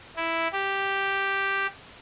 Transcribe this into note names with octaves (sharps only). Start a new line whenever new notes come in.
E4
G4